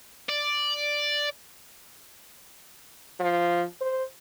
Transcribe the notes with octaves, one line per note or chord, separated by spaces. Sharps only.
D5
F3
C5